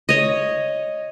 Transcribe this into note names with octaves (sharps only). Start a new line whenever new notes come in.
C#5 D#5